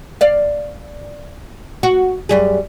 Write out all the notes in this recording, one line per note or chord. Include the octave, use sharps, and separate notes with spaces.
D5 F5
F#4
F#2 G3 G#4